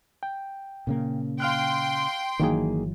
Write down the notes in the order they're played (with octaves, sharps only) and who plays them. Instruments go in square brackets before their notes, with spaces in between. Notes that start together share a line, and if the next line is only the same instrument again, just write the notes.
[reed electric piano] G5
[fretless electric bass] A#2 C#3 A#3
[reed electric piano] F5 F6 F#6 [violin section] G5 C6
[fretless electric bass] G1 E3 F#3 [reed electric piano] D#3 A#3 G#4